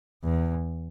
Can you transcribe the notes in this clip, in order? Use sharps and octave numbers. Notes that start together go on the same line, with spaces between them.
E2